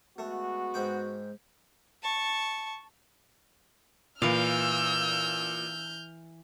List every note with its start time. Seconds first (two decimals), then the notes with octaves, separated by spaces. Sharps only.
0.18 G#3 A3 B3 F#4
0.74 G#2 G5 D6
2.03 A5 C#6
4.22 A#2 E3 F5 E6 F6 G6